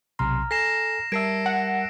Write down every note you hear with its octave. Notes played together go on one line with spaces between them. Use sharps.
B1 C3 A#5 C6 F6
A4 G#5 A#6 C7 E7
G3 A#4 E5 A5 E6 G#6 C7 D7
F#5